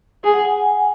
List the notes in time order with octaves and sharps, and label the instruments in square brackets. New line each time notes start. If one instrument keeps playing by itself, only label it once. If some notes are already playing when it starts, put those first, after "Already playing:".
[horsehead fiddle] G#4 [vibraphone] G#5
[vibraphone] F#5
G#5